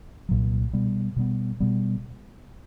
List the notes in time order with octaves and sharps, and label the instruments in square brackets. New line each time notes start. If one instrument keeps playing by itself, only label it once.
[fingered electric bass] C2 A#2 F#3
B2 G3 B3
B2 G3 B3
B2 G3 B3